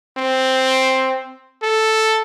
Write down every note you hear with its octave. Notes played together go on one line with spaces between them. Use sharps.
C4
A4